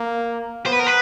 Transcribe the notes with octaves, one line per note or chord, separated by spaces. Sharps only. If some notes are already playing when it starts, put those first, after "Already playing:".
Already playing: A#3
B3 C5
B4
A#4
B4